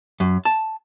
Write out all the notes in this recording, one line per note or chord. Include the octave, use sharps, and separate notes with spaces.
F#2
A5